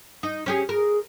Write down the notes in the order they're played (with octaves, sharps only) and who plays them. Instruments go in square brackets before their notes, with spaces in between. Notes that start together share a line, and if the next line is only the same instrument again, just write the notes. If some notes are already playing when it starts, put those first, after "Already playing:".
[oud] D#4
C#4 G4 G#4
[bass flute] G#4 [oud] A#4